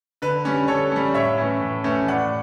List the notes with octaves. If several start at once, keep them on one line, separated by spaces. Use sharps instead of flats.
D3 B4
G3 C#4
D3 A4 C#5
G3 C#4
A2 C#5 E5
E3 A3 C#4
A2
E3 A3 C#4
A2 D5 F#5